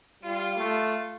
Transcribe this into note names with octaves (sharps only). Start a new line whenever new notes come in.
G3 F4
A3 F4